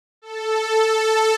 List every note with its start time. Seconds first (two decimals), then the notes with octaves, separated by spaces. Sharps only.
0.22 A4
0.65 A4